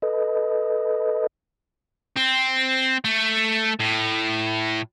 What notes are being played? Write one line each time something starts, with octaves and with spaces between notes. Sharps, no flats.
A4 B4 D#5
C4
A3
A2